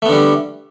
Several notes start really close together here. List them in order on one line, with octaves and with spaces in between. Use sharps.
A3 B3 D3 G3